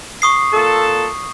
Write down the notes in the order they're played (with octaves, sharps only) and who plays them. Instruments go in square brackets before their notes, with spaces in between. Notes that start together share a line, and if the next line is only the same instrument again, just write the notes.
[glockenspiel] C#6 D#6 C7
[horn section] A#2 A4